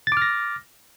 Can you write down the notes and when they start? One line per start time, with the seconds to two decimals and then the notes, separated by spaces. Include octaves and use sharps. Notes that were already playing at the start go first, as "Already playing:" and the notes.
0.07 A6
0.12 D6
0.17 F6
0.22 A#6